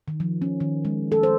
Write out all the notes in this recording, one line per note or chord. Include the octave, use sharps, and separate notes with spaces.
D#3
F3
C#4
D#3
G#3
A4
C5